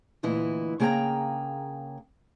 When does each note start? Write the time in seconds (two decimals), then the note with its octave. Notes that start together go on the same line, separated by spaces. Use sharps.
0.23 D2 A#2 E3 E4 D#5
0.80 C#3 A#3 G#4 C#5 G5 A#5